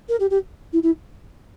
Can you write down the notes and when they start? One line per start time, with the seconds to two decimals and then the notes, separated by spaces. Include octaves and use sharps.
0.09 A#4
0.20 G4
0.30 G4
0.73 E4
0.83 E4